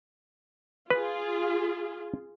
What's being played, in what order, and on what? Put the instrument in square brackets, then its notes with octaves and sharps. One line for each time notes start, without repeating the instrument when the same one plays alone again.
[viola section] F4 G#4 [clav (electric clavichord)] B4